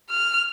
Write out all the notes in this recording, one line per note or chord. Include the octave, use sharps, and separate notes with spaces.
F6